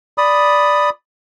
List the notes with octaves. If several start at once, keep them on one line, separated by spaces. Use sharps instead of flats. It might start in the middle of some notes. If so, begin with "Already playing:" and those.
D5 B5 D#6